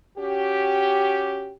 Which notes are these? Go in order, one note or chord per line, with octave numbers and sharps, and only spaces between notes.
C#4 F#4 G4